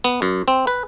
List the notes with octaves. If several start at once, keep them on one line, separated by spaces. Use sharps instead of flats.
B3
F#2
C4
B4